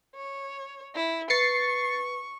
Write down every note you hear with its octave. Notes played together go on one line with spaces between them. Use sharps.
C#5
E4
B4 C#6 A6 C7 C#7